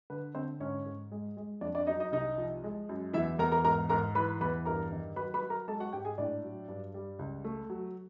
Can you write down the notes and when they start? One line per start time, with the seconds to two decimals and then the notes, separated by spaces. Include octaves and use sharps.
0.10 D3 B4
0.35 D3 C4 C5
0.60 G#2 C#4 C#5
0.86 G#2
1.12 G#3
1.37 G#3
1.61 F2 D4 D5
1.75 D4 D5
1.87 F#3 D#4 D#5
2.00 D#4 D#5
2.12 C2 D#4 D#5
2.38 F3
2.64 G#3
2.89 F#2
3.13 E2 E4 E5
3.39 E2 A#4 A#5
3.52 A#4 A#5
3.65 G#2 A#4 A#5
3.89 G#2 A#4 A#5
4.15 E3 B4 B5
4.41 E2 B4 B5
4.65 G2 A#4 A#5
4.92 D#3
5.16 F#3 B4 B5
5.34 B4 B5
5.42 F#3
5.50 A#4 A#5
5.68 G#3 A4 A5
5.80 F#4 F#5
5.93 G#2 G4 G5
6.05 G#4 G#5
6.18 A2 D4 D5
6.44 F#3
6.68 G2
6.94 G3
7.19 C#2
7.45 A3
7.70 F#3